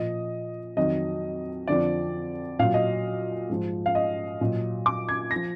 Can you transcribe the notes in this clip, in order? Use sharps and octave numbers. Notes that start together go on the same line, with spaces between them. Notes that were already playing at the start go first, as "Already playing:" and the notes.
Already playing: A#2 F3 D#5
F2 D#3 F#3 D#5
F2 D3 F3 D5
A#2 F#3 F5
D#5
G#2 F3
F5
D#5
A#2 F#3
D6
G#6
A#6
F3